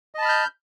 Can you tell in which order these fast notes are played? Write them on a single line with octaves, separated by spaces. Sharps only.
D#5 A5 B5 F6 G6